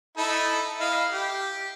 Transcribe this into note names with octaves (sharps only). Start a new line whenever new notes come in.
D#4 E4 A4
E4 D#5 F5
G4